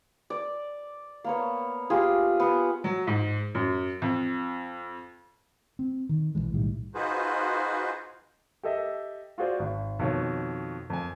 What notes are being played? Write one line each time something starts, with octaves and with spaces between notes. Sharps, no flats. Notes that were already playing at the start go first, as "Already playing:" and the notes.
D5
A#3 B3 C#5
F4 G4 G#4
B3
F#3
G#2
F#2
F2
C4
D#3
B1 E2 E3 G#3
B1 A2 D#3 G3
D#4 F4 F#4 G#4 B4 C5
G4 A4 D#5 E5
F4 F#4 G#4 C5 D5
G#1
F2 B2 D#3 C#5
F2 G#5